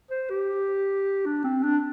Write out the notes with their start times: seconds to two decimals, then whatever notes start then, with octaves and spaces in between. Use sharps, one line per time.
0.11 C5
0.30 G4
1.25 D4
1.44 C4
1.63 D4